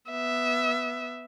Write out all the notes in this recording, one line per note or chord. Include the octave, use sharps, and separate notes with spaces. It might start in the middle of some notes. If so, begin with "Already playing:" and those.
B3 E5